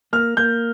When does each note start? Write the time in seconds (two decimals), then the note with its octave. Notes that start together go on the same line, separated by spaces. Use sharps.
0.13 A#3 F6
0.37 A#3 G6